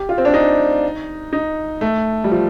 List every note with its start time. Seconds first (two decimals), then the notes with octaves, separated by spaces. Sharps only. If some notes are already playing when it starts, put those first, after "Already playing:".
Already playing: G4
0.09 F4
0.18 C4
0.25 D4
0.34 D#4
1.33 D#4
1.81 A3
2.24 G3
2.31 F3